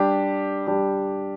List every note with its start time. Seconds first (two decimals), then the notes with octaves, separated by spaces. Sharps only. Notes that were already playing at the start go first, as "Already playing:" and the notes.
Already playing: G3 D4 G4
0.67 G3 D4 G4